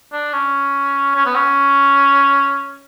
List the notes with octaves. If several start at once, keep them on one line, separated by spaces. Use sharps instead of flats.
D4
C#4
C#4
B3
C#4